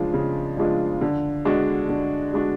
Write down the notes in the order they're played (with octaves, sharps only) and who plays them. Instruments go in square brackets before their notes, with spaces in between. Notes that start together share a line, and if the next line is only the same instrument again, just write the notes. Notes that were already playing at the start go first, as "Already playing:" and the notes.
Already playing: [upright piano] C#3 F3 G#3 D4 F4
C#3
F3 G#3 D4 F4
D3
G#3 D4 F#4
D3
G#3 D4 F#4